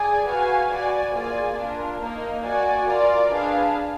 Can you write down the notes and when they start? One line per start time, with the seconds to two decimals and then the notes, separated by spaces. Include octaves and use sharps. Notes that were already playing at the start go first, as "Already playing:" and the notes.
Already playing: G#4 D5 G#5
0.27 F#4 B4 F5 G#5
0.70 F#4 D5 G#5
1.13 A#3 F4 G#4 D5 G#5
1.57 D4 F4 A#4
2.00 A#3 D#4 A#4
2.43 F#4 D5 G#5
2.86 F4 A#4 D5
3.30 D4 G#4 B4 F5